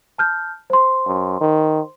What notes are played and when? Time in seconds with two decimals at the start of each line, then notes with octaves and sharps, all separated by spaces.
0.18 A5 F6 G6
0.70 C5 C6
1.06 F#2
1.41 D#3